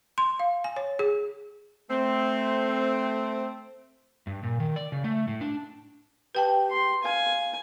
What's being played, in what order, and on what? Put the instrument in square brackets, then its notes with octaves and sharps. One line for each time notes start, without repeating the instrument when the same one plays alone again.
[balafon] C6
F5
G#5
C#5
G#4
[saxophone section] A3 C4
[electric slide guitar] G2
A#2
D#3
D5
C#3
A3
A2
D4
[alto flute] G4 [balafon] B4 G5 A5
[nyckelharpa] C6
[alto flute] F5 [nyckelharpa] G#5